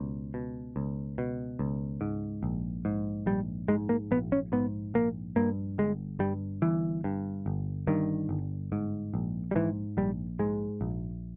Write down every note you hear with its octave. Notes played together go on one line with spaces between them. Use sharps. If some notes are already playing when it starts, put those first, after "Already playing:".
Already playing: C#2 B2
B2
C#2
B2
C#2
G#2
A#1
G#2
A#1 G3
G#2 G#3
A#3
A#1 B3
C#4
G#2 B3
A#1 A#3
G2 A#3
G1 G#3
G2 G3
G1 E3
G2
G1
G2 D#3
G1
G#2
A#1
G3
G#2 E3
A#1 G3
G#2 G#3
A#1